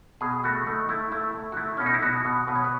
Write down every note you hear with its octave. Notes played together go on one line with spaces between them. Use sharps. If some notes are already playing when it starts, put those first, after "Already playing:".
B2 G#4
A3 F#4
A3 D#4
A3 E4
A3 E4
A3
F#4
A3 E4
B2 C#4
D#4
E4
B2 F#4
B2
B2 B4
C#5
B4